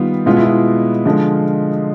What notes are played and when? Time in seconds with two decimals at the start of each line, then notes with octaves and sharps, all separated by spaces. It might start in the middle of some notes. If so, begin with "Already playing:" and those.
Already playing: D#3 G3 B3 F4
0.26 B2 G#3 B3 F4
0.37 E4
0.45 F4
1.05 D3 F3 G#3